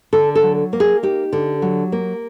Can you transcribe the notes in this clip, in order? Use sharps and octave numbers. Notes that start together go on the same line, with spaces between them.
D3 A4
A4
F#3
A#3
G#4
D#4 G4
D3
F#3
A#3